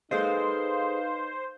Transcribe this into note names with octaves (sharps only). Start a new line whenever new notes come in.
D#4 G#4 A4 B4 C5 D#5 F5